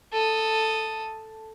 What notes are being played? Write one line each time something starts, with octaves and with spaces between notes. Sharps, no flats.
A4 D#6